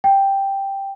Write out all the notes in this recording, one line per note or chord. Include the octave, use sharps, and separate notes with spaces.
G5